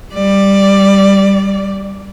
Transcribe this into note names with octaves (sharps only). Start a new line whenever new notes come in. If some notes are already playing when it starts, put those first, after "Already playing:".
G3 D5